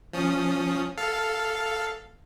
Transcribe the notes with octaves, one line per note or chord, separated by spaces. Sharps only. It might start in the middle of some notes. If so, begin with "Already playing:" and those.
F3 C#4 D#6
A4 F5